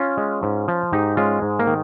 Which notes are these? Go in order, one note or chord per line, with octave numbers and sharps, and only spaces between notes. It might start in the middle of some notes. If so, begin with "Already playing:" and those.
Already playing: C#4 F4
G#3
G#2
F3
G#2 D#4 G4
G#3 C#4 F4
G#2
A#3
D#3